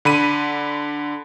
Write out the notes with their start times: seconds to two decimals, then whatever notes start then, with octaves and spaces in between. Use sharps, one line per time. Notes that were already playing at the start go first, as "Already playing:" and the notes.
0.05 D3 B5 D#7